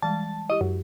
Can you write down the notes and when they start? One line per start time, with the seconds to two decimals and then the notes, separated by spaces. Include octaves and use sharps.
0.02 E3 G3 G#3 A5
0.50 E4 G4 D#5
0.61 F#2